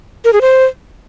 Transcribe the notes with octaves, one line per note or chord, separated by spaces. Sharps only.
A#4
G#4
C5